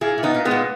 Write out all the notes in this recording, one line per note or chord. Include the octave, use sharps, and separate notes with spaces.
A#2 E4 G#4
A#2
B3 D#4
A#2
G#3 B3
A#2